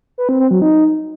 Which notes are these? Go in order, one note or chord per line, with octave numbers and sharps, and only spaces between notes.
B4
C4
C4
F#3
D#4